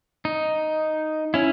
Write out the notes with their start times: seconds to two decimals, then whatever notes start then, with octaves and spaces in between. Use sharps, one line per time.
0.25 D#4
1.34 C#4 E4